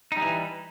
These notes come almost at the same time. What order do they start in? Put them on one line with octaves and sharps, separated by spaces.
D#4 G3 E3